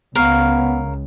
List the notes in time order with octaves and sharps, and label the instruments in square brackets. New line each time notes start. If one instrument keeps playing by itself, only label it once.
[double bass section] C#2 [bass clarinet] B3 [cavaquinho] A#4 C#5 F5